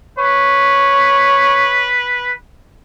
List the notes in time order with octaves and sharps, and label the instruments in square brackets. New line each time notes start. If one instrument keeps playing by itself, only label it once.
[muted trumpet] B4 [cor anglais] C#5